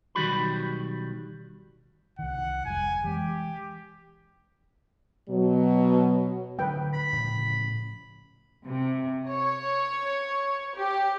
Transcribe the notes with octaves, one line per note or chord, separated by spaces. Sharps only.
B1 D#3 G3 F#4 B5
C2 D#3 F#5
F1 G3 G#5
E3 G#3 G4
B2 F#3
D3 F#3 A3 B4 G5
B5
A2 C#3 F3
C3
C#5
G4